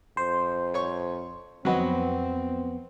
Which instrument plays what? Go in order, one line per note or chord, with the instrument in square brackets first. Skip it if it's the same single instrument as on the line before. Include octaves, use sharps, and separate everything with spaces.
[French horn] F2 [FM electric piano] C5
[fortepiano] C#5 C#6
[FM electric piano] F2 B3 [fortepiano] F#3 F#4 D#5 [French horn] C4